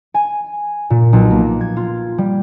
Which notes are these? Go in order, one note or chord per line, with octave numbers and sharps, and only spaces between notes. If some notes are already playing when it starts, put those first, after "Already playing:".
G#5
A#2
B1
A#3
G#6
F4
G3